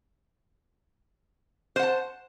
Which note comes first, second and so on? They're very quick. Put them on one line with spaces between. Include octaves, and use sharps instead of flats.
C5 F#5 A5